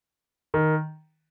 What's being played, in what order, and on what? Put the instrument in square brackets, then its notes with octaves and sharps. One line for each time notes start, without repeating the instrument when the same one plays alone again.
[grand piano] D#3